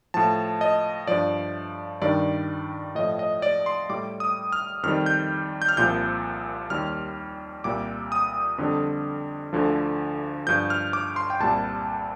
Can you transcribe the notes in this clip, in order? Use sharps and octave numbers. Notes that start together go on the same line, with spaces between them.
A2 F3 A5
D#5
G2 F3 D5
G2 D#3 G3 D5
A2 F3 D#5
D#5
D5
C6
A2 G3 D6
D#6
F6
F2 D#3 G3 F6
G6
G6
F6
C2 A#2 F3 G6
D#2 D#3 G3 F6
C2 A#2 G3 D6
D#6
F2 D3 G3
D2 D3 F3
G2 F3 G6
F6
D6
C6
G5
C2 A#2 G3 A5